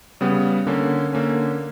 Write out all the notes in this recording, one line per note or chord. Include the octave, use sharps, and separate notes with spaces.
C#3 G3 B3
D3 A#3 C#4
D3 A#3 C#4